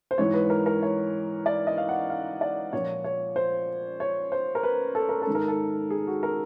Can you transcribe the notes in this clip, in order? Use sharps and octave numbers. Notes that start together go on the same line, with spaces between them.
C5
G#2 E3 C#5
B4
A#4
A#4
C#5
D5
D#5
F5
F#5
F5
D5
A#2 F3 C#5
C#5
C5
C#5
C5
A#4
B4
A4
A#4
A4
G#2 D#3
A#4
A4
G#4
F#4
A#4